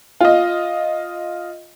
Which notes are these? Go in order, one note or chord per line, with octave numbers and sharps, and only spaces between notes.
F4 D#5